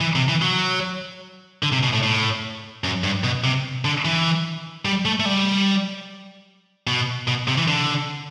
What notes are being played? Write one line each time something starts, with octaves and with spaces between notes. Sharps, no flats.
E3
C3
E3
F#3
D3
C3
B2
A2
A2
F#2
G2
B2
C3
D3
E3
G3
A3
A3
G3
B2
B2
C3
E3
D3